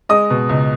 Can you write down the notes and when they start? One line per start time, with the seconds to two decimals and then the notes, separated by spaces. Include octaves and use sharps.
0.09 G#3 D#5 D#6
0.30 B2
0.49 C#2